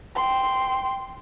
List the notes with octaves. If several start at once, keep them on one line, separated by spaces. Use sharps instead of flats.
G5 C6